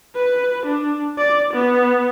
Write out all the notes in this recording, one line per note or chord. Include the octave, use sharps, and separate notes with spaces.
B4
D4
D5
B3